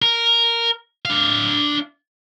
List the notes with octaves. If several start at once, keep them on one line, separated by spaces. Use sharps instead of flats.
A#4
D4 F5